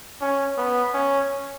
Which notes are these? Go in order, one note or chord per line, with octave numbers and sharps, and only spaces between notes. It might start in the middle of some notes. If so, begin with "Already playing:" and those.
C#4
B3
C#4